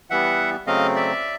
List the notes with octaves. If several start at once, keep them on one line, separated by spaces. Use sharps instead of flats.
E3 G3 B3 E5 F#5
C#3 F#3 A3 C4 D#5 F5
D5 E5